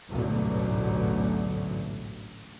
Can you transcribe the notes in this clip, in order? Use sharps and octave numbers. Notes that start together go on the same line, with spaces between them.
A1 D2 G#2 B2 D3 F#3